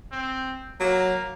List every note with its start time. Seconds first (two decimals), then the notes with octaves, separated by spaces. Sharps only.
0.12 C4
0.80 F#3 A#3